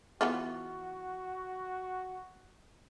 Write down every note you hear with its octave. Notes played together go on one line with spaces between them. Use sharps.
E3 B3 F4 F#4